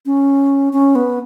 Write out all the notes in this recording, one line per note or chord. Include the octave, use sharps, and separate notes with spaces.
C#4
C#4
B3